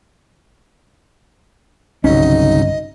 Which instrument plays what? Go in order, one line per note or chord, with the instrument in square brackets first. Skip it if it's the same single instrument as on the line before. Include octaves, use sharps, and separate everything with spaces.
[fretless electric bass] G1 C#4 [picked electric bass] C2 F#3 [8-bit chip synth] C#3 D#4 [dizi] D#5